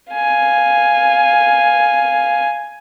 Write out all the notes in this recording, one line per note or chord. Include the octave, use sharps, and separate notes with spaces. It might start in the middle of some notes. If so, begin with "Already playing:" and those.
F5 G#5